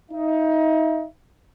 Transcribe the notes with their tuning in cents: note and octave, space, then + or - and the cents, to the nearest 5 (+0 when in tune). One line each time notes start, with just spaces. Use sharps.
D#4 +25 E5 +35